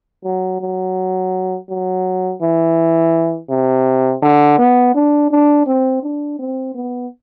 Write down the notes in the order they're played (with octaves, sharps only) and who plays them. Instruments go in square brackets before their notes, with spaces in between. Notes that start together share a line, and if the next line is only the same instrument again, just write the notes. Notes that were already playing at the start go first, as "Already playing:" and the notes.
[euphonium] F#3
F#3
F#3
E3
C3
D3
B3
D4
D4
C4
D4
C4
B3